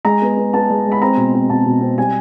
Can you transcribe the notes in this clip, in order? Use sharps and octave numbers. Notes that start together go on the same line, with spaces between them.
G#3 A#5
B3
B3
B3 A5
G#3
G#3
B5
C4 A#5
B2
C4
B2 A5
B2
C4
G3 G#5